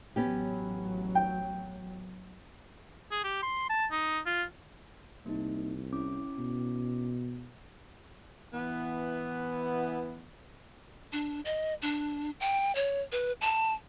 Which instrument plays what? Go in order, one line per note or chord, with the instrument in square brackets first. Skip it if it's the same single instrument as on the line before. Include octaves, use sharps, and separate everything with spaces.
[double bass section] A1 F#3 [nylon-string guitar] B3 C#4 G4
[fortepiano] G5
[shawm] G#4
G4
C6
A5
D#4
F4
[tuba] C2 [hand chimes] A#3 D#4
[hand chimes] C#4 E4 D6
[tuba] B2
[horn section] E3 B3
[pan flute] D4
D#5
D4
G5
C#5
B4
A5